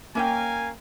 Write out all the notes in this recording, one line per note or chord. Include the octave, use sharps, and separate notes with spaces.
A#3 C#4 A#4 F5 G5 G#5